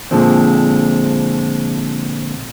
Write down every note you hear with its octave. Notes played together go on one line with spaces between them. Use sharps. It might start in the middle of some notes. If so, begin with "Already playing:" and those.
A#2 D3 F3 G#3 C4